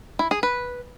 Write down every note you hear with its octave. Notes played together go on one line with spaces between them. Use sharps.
E4
G#4
B4